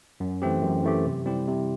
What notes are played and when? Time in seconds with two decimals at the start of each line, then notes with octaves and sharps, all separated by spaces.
0.20 F#2
0.42 E3 A3 C4 G4
0.63 F#2
0.84 E3 A3 C4 G4
1.05 C3
1.26 G3 C4 E4 G4
1.48 C3